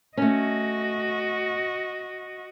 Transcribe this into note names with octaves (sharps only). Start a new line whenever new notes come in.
A3 C#4 F#4 D#5